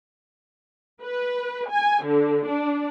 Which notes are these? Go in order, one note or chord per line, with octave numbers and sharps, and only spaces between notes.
B4
G#5
D3
D4